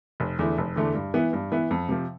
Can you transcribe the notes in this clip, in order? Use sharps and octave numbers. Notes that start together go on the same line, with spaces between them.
F1
E2 D3 A3 E4
F1
E2 D3 A3 E4
G2
E3 B3 E4
G2
E3 B3 E4
F2
C3 F3